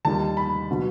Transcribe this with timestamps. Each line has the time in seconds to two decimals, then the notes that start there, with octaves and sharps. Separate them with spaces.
0.05 D#2 D#3 G3 A5
0.37 B5
0.71 B2 F#3